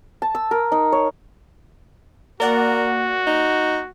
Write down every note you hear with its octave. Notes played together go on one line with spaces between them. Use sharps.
A5
E6
A#4
D#4
C#5
A#3 F#4 A#4 D5 F#5
D#4